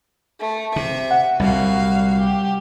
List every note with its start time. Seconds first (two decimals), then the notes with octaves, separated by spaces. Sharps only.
0.39 A3
0.76 C3 E5
1.11 F#5
1.40 C2 A#2 G3 F#4 F5
2.19 G4